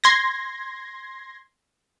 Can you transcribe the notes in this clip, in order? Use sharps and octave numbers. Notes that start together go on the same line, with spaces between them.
C6 G#6 A#6